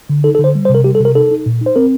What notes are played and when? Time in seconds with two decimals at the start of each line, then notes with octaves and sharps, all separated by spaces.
0.10 D3
0.24 D#4 A4
0.35 A4
0.39 D3
0.44 C5
0.55 G3
0.65 C5
0.69 C3
0.75 A#4
0.84 G3 G4
0.95 A4
1.00 C3
1.05 A#4
1.15 D#4 A4
1.31 D#4
1.46 A#2
1.61 D#4
1.66 C5
1.76 C4 A#4